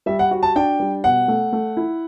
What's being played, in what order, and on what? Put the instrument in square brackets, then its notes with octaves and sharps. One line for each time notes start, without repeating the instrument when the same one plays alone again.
[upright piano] G3 [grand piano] E5
[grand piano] F#5
[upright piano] F#4
[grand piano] A5
[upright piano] D4 [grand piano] G5
[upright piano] G3
[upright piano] B2 [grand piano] F#5
[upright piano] A3
A3
E4